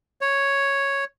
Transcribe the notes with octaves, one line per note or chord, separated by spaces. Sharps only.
C#5